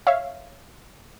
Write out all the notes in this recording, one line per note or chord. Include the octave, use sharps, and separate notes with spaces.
C#5 E5 F5